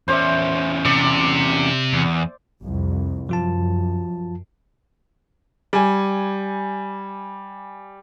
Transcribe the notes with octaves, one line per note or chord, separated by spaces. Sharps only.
E2 C#4 C5 D5 E5
C3 D5
E2
C2 F2
F#2 F3 F4 A5
G3 G#5